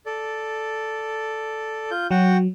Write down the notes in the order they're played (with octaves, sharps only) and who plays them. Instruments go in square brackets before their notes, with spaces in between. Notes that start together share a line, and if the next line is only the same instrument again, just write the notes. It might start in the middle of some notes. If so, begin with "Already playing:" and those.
[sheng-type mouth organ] A4 D5
F4 G6
[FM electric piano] F#3 [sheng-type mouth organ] F#4 F#5 G5